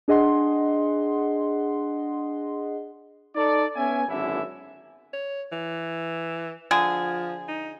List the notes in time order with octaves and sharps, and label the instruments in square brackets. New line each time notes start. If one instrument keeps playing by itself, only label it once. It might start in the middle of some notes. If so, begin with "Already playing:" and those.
[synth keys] D4 G#4 D#5 F#5 C6
[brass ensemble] D#4 A4 D5
B3 C#4 E5 G#5
G#1 F#2 D3 E4 E5
[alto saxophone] C#5
E3
[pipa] D3 G#4 [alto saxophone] F3
[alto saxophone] D#4